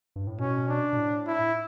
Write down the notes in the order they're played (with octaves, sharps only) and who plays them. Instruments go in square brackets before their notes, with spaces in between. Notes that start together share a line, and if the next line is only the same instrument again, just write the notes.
[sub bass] G2
A2
[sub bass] B2 [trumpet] C#4
[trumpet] D4
[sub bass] B2
A2
[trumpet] E4